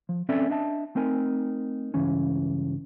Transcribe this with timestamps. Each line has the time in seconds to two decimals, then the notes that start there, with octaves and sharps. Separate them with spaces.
0.09 F3
0.29 C4 C#4 A4 D5 E5
0.50 D4 D#5 E5 A5
0.95 A3 C4 D#4 A#4 G#5
1.94 C#2 G2 E3 C#4